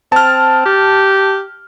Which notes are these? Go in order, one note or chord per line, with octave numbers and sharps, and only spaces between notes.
C4 A5 F6
G4